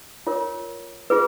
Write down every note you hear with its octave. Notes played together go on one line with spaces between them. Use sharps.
F4 A#4 C#5
F4 G#4 B4